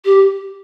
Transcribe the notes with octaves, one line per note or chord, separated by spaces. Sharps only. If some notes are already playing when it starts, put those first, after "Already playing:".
G4